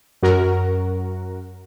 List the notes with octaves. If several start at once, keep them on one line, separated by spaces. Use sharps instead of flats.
F#2 F#4 A#4